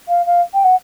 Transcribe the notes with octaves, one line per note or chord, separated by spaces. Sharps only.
F5
F5
G5
F#5